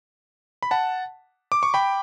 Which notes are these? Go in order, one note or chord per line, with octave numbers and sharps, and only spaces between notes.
B5
F#5 A5
D6
C#6
G5 B5